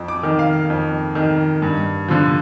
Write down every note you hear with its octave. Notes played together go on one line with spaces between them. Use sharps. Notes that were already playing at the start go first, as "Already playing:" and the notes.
Already playing: F2
D6
D#3
F5
F2
D#3
G2
D3 F3